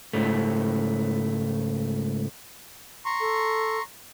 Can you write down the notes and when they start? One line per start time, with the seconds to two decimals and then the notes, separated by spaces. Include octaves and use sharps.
0.13 C#2 G#2 A3
3.05 A#5 C6 C#6
3.20 A4